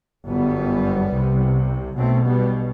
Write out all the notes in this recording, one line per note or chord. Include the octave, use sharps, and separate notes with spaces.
G1 F#2 G3 B3
C2 C3
B1 B2 A3 C4
G3 B3